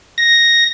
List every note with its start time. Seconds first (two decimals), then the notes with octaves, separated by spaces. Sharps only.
0.18 A#6